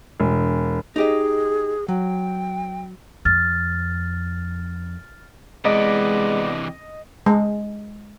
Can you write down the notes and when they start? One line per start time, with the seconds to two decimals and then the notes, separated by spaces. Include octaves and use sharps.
0.20 E1
0.96 D#4 G4 G#4 D#5
1.88 F#3 G5
3.25 F2 F6 A6
5.65 C3 E3 G#3 B3 D5 D#5
7.26 G#3